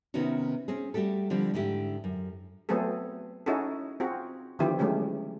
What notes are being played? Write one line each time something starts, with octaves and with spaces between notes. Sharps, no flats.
C3 D#3 B3 C#4 D#4 F#4
C4 C#4 G#4
G3 A3 F#4 G4 A4
D3 F3 G3 C4
G#2 D3 E4 G4
F#2
F#3 A3 B3 C4 G#4 A4
C#4 D#4 E4 F#4 G#4 A4
C4 F4 F#4 G#4
D3 D#3 F3 B3 E4 G4
F#3 G#3 A3 C#4 G4